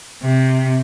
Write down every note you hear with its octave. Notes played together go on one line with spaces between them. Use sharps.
C3